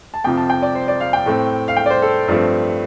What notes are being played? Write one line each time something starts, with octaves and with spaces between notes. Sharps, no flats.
A5
F2 C3 F3 G5
A5
G5
D5
C5
D5
F5
G5
A2 A3 C4
F5
G5
D5
C5
A4
G2 F3 A3 C4